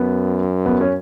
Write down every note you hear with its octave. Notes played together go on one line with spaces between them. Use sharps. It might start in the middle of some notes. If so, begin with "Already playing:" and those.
Already playing: F#2 B3
B3
C#4